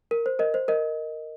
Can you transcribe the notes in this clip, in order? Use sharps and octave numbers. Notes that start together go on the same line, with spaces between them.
A#4
C5
A#4 D#5
C5
A#4 D#5